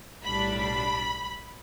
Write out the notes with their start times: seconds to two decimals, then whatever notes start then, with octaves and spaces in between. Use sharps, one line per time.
0.23 B1 A2 G3 D4 B5
0.61 B5